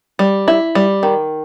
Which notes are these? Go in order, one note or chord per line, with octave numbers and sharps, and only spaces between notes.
G3
E4
G3
D#3